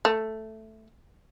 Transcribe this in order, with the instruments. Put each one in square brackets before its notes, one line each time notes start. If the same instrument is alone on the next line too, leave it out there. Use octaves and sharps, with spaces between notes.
[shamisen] A3